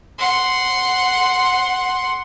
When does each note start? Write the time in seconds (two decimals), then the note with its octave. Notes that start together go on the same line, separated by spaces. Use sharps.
0.18 F#5 C6